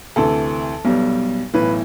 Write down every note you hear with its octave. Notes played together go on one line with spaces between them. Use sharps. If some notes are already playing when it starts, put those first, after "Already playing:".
D2 C3 E3 A4
B1 B2 G3
B1 A2 E3 B4